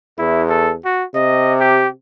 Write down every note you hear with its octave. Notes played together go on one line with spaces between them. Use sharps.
E2 E4
A4
F#4
C3 D#5
G4